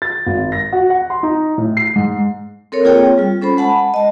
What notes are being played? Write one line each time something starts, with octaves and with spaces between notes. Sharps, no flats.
A6
G#1
A#6
F#4
F#5
C6
D#4
A2
C7
G#2
C4 A4 A#4 C#5
A#3 C4 F4 G#4 C#5 G5
G3 F4
C#4 A4 C5 B5
G#3 F#5 A5 B5
D#5 A5